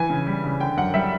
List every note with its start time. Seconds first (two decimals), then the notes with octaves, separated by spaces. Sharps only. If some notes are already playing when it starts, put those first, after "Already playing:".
Already playing: E3 G#5
0.10 C#3
0.27 G3
0.44 C#3
0.60 D3 G5
0.77 F#2 F#5
0.94 G3 E5